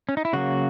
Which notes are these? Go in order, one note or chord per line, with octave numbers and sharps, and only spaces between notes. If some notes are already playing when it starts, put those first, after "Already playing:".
C#4
D#4
E4
C#3 F#3 A#3 F#4